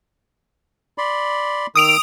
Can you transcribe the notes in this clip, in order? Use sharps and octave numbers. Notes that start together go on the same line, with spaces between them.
D5 B5 C6
D#3 D#6 E6 D7 F7